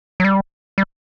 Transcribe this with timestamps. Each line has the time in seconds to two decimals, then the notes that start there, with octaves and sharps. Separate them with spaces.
0.20 F#3
0.24 G3
0.78 G3